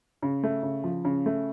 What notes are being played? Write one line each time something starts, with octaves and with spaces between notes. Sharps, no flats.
C#3
A3
C#3
F3
C#3
A3